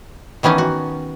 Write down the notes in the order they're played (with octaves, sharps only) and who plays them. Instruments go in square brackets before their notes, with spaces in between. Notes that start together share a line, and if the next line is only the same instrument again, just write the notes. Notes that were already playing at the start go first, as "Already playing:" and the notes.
[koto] D#3 E3 B3 C#4 D#4
F#4